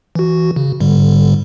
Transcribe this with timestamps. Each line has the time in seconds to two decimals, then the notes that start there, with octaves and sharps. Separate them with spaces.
0.15 E3 F#4
0.56 C#3
0.80 G#2 D3 G3